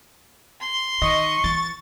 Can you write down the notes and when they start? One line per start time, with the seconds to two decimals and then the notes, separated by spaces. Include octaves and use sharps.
0.61 C6
1.02 D#3 D#5 C#6
1.44 E3 A6